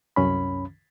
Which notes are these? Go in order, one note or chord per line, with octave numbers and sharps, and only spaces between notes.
C2 F#2 C#4 B5